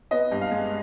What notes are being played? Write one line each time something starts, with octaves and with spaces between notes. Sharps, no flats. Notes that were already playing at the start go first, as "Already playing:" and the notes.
B3 D#5
G2
F5
G#3